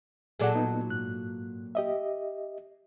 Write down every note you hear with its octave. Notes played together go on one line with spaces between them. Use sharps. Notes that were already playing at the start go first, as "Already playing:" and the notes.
A#2 F#3 G#4 A4 D5 F#5
B3 D#4
G#2 F#6
G4 D#5 E5